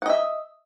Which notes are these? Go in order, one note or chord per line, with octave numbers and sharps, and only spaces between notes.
D#5 E5 F#5